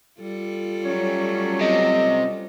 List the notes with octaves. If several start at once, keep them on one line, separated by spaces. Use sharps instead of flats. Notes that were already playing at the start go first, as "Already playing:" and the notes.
G3 F4 A4
F#3 A3 C#4 C#5
C3 D#5